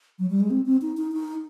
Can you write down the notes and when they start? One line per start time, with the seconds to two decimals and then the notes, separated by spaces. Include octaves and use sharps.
0.19 F#3
0.30 G3
0.40 G#3
0.50 C4
0.66 C4
0.82 D#4
0.97 D#4
1.12 D#4